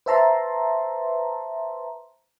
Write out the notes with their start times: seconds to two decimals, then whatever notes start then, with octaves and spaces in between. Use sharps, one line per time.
0.06 B4 C5 E5 A5 A#5 C6